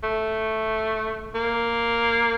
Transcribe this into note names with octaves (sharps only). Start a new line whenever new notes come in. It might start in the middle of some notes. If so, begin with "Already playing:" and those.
A3
A#3